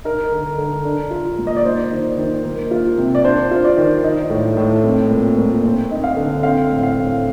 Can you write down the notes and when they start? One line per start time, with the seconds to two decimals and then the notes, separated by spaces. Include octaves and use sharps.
0.04 D#4 A#4
0.32 D3
0.58 D3
0.85 D4
1.11 F4
1.38 A#2
1.47 D#5
1.57 D5
1.65 D#4 C5
1.91 D#3
2.17 D#3
2.45 A#3
2.71 F4
2.98 C3
3.15 D5
3.24 D4 C5
3.51 F4
3.64 D5
3.77 D#3
4.04 D#4
4.30 A2
4.57 A2
4.84 C4
5.11 A#2
5.37 A#2
5.64 C4
5.91 D#4
6.04 F5
6.16 D3
6.43 C4 F5
6.71 A2
6.83 F5
6.97 A2